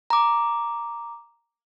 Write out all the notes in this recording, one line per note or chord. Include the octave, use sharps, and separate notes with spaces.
A#5 D6